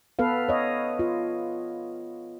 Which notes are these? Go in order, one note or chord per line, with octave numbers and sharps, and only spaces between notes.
B3 A4 B4 F5
C#5 D#5
F4